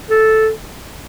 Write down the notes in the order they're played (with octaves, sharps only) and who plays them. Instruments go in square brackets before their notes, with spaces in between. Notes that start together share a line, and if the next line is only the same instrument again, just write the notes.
[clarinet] A4